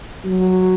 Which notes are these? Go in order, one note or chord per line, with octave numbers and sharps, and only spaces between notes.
F#3